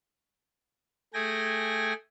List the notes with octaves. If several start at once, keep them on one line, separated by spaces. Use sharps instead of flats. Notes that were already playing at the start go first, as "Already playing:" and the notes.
A3 G#4 G5 G#5 A#6